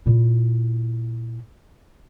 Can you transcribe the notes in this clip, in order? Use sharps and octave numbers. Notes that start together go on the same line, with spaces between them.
A#2 E4